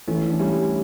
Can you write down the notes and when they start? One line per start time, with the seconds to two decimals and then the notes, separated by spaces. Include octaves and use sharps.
0.08 E3 A3 C#4
0.29 D4
0.39 G3 C#4 E4